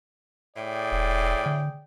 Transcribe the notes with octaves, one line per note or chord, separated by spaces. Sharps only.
A2 G#4 D5 G5
E1
D3